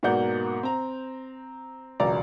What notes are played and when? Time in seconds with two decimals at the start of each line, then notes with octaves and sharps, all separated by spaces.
0.03 G#2 B2 A#3 D5 F#5 G6
0.63 C4 A#5
2.00 E1 C#2 F#3 D5 A#5